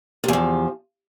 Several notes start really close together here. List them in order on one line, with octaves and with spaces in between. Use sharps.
C3 E2 F3